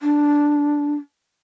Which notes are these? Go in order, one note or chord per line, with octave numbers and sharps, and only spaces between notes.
D4